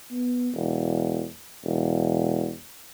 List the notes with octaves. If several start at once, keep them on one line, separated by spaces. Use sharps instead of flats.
B3
E1
E1